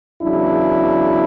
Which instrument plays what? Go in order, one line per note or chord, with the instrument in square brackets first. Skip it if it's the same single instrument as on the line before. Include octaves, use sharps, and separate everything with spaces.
[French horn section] E2 C#3 F#3 D4 E4